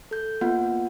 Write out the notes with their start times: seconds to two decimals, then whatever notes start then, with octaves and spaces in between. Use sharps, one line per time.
0.11 A4 G6
0.41 A#3 B3 F4 F#5